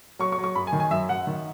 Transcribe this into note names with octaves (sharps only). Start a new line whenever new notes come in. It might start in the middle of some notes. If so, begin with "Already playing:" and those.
F#3 C#6
C#6
F#3
C#6
F#2 B5
G#5
D#3
G#5
F#2 E5
F#2 F#5
D#3